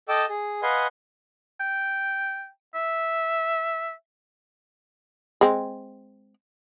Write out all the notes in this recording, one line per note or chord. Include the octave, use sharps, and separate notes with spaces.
A4 D#5 G5 D6 E6
G#4
B4 D#5 F5 F#5 G#5 C6
G5
E5
G#3 C4